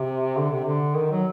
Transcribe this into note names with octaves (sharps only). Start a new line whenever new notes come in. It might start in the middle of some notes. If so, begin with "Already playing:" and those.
Already playing: C3
D3
C3
D3
D#3
F#3